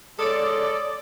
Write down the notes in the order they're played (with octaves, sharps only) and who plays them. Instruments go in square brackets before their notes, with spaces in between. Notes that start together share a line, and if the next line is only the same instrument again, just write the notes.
[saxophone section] G#3 A4 [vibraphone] C#5 D#6 [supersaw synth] D5